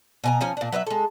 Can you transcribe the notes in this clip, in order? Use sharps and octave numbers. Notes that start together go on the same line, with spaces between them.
B2 G#5 A#5
F3 C#4 G#5 A#5
A#2 D4
F#3 B4 D5 E5
G#3 A4